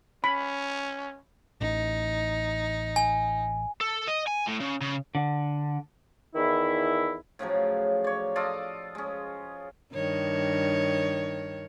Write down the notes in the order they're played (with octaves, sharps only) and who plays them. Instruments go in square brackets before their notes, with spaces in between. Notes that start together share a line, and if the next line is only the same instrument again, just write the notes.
[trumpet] C#4 [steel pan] B5
[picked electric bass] A1 [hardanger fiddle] D#4
[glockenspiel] G#5
[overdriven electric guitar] A4
D#5
G#5
A2
C#3
C#3
[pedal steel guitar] D3
[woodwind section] E2 D#3 E4
[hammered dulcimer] A2 C#3 F3 F#3
C#5 D5
F4 A4 D5 D#5
G#3 C#4
[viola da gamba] G2 D#3 C#5